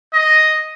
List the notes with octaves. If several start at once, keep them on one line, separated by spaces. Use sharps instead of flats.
D#5